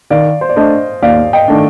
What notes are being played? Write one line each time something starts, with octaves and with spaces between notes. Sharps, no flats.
D#3 D5 F5
C5
D5
A3 D4 A4 C5 D#5
D#2 D5 F5
D#5 G5
D#3 A3 D4